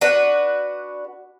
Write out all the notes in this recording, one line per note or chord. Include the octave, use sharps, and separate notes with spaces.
D4 F#4 B4